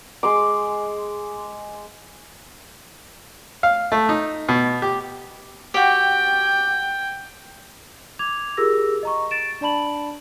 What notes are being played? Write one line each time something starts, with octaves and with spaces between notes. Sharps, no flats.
G#3 C6 D6
F5
A3
D#4
B2
G4
F#4 G4 G5
D6 G#6 F7
F4 G4 G#4 A#4 E6 A#6
D#5 A#5 C#6
A6 D7 E7
D4 D5 A5 B5 F#7